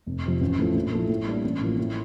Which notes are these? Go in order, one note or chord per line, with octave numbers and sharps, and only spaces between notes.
F1
F2 C3 F3 C4
A1
A2 F3 A3
A#1
A2 F3 A3
A2
G3 A#3 D4
A1
A2 F3 A#3
A2